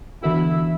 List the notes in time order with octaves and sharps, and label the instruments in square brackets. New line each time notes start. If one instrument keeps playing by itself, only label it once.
[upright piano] E3 B3 D4 F#4 [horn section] E4